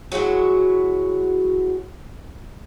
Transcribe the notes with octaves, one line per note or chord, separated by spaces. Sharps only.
F#3 G#3 E4 F#4